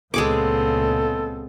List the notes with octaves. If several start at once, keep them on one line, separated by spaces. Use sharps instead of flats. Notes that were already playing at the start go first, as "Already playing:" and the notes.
C#2 A#2 G#3 B3 C4 G#4 A4 D6